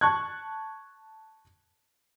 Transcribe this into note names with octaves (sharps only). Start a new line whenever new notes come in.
A5 C#6 F#6 G#6